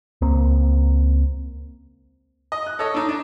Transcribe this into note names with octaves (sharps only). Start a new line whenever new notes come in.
C#2 A#3 C4
D#5
F#6
A4 C#5 D#5
D4 D#4
D4